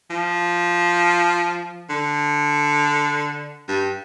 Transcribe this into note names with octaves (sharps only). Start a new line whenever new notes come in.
F3
D3
G2